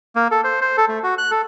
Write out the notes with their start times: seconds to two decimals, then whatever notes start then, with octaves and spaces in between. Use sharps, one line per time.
0.16 A#3
0.31 A4
0.44 C5
0.61 C5
0.77 A4
0.89 A3
1.04 F#4
1.18 F#6
1.31 A4